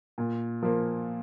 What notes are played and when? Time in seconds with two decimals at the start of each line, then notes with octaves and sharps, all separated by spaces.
0.18 A#2
0.62 F3 A#3